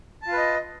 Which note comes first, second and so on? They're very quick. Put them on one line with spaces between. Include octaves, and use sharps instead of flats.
A5 F4 B4 D#5